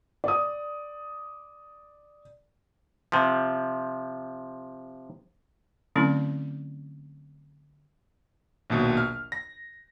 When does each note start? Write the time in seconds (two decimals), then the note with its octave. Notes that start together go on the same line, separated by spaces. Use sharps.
0.24 D5 D#6
3.12 C3 F3
5.96 D3 F#3 A3 C4 C#4 E4
8.70 A#1 D#2 B2 F#3
8.97 F6
9.32 A#6